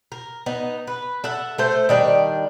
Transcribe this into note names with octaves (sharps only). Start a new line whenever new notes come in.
A#4
B3 D#4
B4
A4 E5 F#5
A3 A4 C5
D#3 G3 D4